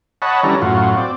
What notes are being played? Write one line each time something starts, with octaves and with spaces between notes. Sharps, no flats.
C#5 D#5 F#5 A5 B5
E3 G3 C#4 D4 A4 A#5
F#2 A2 F4 F#4
C4 D5